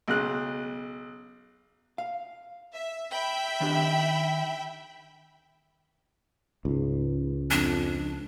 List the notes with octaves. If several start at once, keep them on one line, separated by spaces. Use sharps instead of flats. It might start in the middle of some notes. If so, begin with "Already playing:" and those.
B1 C#3 F#6
F5
E5
E5 G5 B5
D#3 D4 G4
C#2 G#2
F2 D4